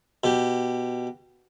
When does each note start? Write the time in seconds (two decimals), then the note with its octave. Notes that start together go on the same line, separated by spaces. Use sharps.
0.24 B2 G4